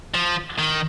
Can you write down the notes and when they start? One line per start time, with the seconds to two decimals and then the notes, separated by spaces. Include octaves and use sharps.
0.14 F3
0.59 D#3